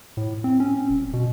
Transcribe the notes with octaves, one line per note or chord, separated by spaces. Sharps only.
A2
C4
C#4
D#1
B2